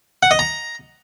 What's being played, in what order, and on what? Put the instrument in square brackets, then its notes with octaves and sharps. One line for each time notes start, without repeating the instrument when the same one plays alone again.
[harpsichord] F#5
D#5
A#5